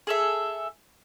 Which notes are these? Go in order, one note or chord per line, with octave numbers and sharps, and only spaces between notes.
G#4 A4 E5